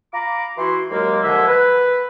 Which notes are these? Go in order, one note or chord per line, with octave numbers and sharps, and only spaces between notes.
F5 A#5 B5 D6
E3 E4 F#4 C6
D#2 F#3 G#3 A#3
D#2 D3 F3 G#3 E5
B4